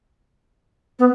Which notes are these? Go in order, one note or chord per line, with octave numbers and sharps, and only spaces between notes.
B3